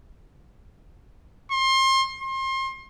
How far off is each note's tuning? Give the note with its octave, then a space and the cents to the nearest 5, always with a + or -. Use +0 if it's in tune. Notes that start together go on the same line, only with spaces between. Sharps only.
C6 +30
C6 +35